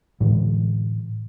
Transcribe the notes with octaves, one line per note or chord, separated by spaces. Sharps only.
A2 D3 E3 G#3